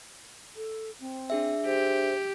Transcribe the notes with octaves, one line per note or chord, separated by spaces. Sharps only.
A4
C4
D4 G#4 E5
G4 C5